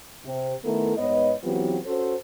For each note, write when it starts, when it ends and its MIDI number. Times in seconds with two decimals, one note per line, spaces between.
0.25 0.54 48
0.65 0.93 51
0.65 0.93 57
0.65 0.93 59
0.65 0.93 64
0.65 0.93 69
0.65 0.93 70
0.97 1.33 44
0.97 1.33 59
0.97 1.33 71
0.97 1.33 73
0.97 1.33 75
1.44 1.78 52
1.44 1.78 54
1.44 1.78 59
1.44 1.78 60
1.44 1.78 65
1.44 1.78 67
1.86 2.14 61
1.86 2.14 66
1.86 2.14 69
1.86 2.14 72